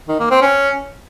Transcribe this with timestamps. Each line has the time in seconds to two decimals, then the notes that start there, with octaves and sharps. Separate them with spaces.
0.09 D#3
0.20 A#3
0.31 C4
0.42 C#4